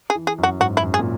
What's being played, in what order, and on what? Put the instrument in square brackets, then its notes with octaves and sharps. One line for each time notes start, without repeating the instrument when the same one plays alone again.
[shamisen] G#4
[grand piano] E3
[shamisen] G#4
[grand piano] F#2
[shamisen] F#4
[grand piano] G#2 [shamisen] F#4
[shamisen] E4
[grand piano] F#2
[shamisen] G#4
[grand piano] A#2